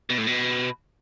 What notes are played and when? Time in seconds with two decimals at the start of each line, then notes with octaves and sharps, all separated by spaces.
0.10 B2
0.18 A2
0.27 B2